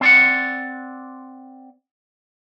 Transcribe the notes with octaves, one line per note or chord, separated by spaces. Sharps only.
C4 D5 F#5